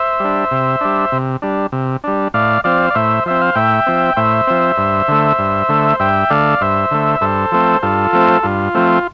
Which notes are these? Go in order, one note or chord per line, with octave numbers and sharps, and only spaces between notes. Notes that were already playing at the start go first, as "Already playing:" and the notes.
Already playing: C5 E5
G3 D4
C3
G3 D4
C3
G3 D4
C3
G3 D4
A2 D5 F5
F3 C4 D5 F5
D5
A2 C5 E5
F3 C4 E5
F5
A2 E5 G5
F3 C4
A2 C5 E5
F3 C4
G2
D3 A3
G2
D3 A3
G2 E5 G5
D3 A3 D5 F5
G2 C5 E5
D3 A3
G2 A4 C5
F3 A3 C4
G2 F4 A4
F3 A3 C4
G2 F4
F3 A3 C4